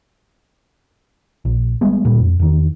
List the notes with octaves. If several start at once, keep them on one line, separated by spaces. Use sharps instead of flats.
A#1
G3 G#3 B3
D2 A#2 G3
F2
E2 D#3